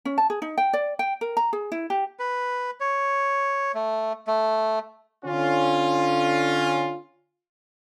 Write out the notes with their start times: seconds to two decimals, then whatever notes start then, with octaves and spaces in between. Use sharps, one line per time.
0.05 C#4
0.18 A5
0.30 G#4
0.42 D#4
0.58 G5
0.73 D5
0.99 G5
1.21 A#4
1.37 A#5
1.53 G#4
1.72 E4
1.90 G4
2.19 B4
2.80 C#5
3.74 A3
4.27 A3
5.25 D3 C#4 F4